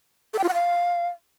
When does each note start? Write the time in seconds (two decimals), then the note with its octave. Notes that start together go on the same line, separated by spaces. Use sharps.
0.34 A4
0.39 G5
0.44 F4
0.49 F#5
0.54 F5